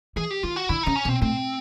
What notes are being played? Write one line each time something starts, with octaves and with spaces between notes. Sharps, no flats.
E3 G#4
G4
D#3 F4
F#4
D3 E4
C#3 D#4
C#4
B2
C4
A2 C4